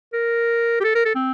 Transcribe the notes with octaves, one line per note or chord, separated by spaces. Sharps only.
A#4
G4
A4
A#4
A4
C4